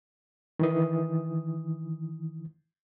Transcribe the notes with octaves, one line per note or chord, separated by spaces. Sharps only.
D#3 E3 D#6